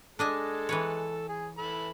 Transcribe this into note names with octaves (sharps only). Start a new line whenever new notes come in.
G#3 D4 A4 D#5 G#5
E3 B4 C#5
G#4
E3 A4 B5